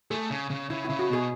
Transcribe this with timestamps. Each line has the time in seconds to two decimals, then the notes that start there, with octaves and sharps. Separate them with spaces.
0.11 A3 G#4
0.31 C#3
0.50 C#3
0.70 C#3 E4
0.85 C#3 E4
0.99 F#4
1.09 B2 G#4